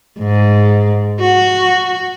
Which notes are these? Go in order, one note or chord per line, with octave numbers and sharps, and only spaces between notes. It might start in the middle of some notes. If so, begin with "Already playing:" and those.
G#2
F#4